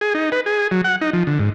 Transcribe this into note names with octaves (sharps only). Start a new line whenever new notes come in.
G#4
D#4
B4
G#4
F#3
F#5
D#4
F3
D3
G#2